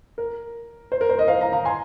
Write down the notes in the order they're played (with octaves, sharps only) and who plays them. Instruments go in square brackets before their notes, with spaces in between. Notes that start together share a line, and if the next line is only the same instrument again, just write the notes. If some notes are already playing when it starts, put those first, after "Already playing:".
[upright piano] A#4
C5
A#4
C5
A#4 D#5
C5 F5
F5 A#5
F5 A#5
G#5 C6